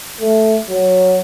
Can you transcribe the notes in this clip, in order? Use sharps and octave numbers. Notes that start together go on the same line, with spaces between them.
A3
F#3